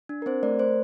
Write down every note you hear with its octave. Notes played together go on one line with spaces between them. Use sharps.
D4
A#4
C4 C5
A3 A#4 D5
A3 C5